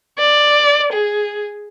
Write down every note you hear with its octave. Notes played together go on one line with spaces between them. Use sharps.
D5
G#4